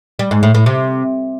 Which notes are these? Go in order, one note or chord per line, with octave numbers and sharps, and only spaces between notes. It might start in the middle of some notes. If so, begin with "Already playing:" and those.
G3
G#2
A2
A2
C3